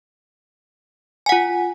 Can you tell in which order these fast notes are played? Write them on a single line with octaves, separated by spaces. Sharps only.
G#5 F#5 F4